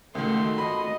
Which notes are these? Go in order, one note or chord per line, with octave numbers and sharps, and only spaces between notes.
C#2 D#3 A3 F#4 C6
D#5 B5